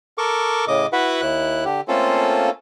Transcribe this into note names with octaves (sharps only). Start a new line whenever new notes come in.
A4 A#4 C#6 D6
A2 C#3 D#5 D6
E4 F#4 B4 E5 F#5
D#2 E4 F#6
D3 G4
A3 A#3 C4 C#4 F4 A4